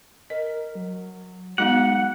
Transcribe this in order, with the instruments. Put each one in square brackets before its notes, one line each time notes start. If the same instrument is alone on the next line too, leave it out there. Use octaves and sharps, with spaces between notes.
[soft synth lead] A#4 [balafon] D#5
[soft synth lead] F#3
[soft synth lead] G#3 [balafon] B3 D#4 F#4 [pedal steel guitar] F#5